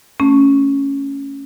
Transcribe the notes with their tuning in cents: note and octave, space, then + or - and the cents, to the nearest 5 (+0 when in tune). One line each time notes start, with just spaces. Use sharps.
A3 +15 C#4 +0